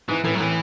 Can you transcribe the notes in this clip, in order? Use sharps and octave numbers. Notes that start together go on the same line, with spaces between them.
G#2 E3
A2 E3
F#3
A2 E3